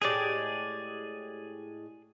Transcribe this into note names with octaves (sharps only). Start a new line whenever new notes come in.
A2 G#3 G4 G#4 D5